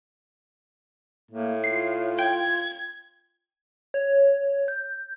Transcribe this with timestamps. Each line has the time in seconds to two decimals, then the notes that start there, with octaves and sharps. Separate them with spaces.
1.31 A2 A#3
1.64 F4 C7
2.19 G5 G#6
3.94 C#5
4.68 G6